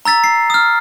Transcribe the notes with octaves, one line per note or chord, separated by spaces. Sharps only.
A#5 E6 A6 B6
C7
D#6 F6